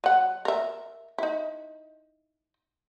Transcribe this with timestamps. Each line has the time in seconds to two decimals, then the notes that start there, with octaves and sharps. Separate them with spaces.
0.04 F#3 F#5
0.45 A#4 E5
1.18 D#4 E4